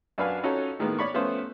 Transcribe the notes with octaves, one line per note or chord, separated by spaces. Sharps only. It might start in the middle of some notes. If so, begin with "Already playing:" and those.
F#2 D4 B4 F5 G#5
C#4 D#4 F4 F#4 A4 C#5
A2 D#3 G#3 A#3 B3
C#5 D5 B5 C#6
F3 A3 B3 C#4 F4 C5